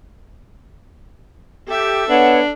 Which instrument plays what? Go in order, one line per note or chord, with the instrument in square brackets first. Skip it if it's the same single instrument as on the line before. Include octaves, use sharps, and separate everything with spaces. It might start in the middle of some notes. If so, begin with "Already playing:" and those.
[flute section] G4 [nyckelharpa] A4 E5
[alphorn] B3 [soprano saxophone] D4 [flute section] C#5 F#5